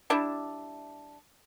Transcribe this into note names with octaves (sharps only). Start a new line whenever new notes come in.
G3 D4 E4